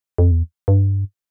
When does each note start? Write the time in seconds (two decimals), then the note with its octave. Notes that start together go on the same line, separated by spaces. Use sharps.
0.18 F2
0.31 E2
0.68 G2